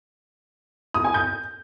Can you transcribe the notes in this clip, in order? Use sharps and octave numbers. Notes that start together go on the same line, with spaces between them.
D#6
G#5
G6